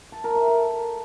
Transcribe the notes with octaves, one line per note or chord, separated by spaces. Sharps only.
A5
A#4
E5
A4